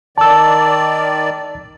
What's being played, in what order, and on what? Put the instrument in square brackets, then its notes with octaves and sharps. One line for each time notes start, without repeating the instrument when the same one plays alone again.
[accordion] D#3 D5 [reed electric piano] A5 E6